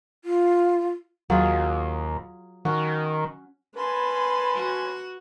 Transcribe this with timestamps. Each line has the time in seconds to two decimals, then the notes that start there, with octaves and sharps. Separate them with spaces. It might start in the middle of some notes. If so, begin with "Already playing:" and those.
0.25 F4
1.30 D#2 F#3 F4 G#4
2.65 D#3 C#4 F#4
3.76 C#4 B4 G#5 A5 B5 C6
4.55 F#4